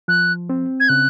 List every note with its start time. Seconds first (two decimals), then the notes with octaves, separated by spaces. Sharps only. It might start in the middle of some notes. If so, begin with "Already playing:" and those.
0.08 F3 F#6
0.50 C4
0.80 G#6
0.89 C#3 F#6